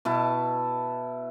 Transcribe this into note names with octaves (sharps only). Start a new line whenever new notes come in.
B2 E4 A5